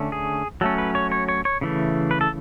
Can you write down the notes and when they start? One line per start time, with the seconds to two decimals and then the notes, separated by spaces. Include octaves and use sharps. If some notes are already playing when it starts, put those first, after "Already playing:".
Already playing: D3 A3 C#4
0.12 G#4
0.61 F#3 A3 C#4 A4
0.78 B4
0.95 C#5
1.12 C#5
1.29 C#5
1.45 C#5
1.61 C#3 E3 A3
2.11 B4
2.21 A4